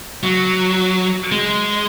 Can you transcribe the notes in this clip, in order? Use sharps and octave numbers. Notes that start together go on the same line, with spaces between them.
F#3
G#3